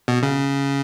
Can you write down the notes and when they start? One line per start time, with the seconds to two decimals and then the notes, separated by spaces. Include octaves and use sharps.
0.08 B2
0.23 C#3